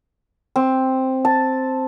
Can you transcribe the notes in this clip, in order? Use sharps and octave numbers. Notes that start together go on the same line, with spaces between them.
C4
A5